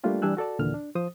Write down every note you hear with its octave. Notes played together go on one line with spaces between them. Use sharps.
G3 A3 A#3 D4 F4 G4
E3 G3 D4 G#5 E6 F#6
F#4 A4 D5 A5
D#2 A#2 D3 E3 F6
D4
F3 C5 D#6